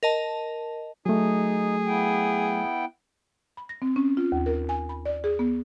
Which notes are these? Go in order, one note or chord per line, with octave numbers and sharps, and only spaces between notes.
A#4 D#5 A5
F#3 A3 D#4 G#4
B3 E4 G5
B5
A#6
C4
C#4
F4
D#2
A#4
G#5
B5
D5
G#4
B3